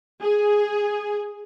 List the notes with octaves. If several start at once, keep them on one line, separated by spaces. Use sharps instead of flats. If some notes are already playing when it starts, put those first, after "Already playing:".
G#4